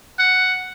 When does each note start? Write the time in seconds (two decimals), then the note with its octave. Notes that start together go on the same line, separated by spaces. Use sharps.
0.19 F#5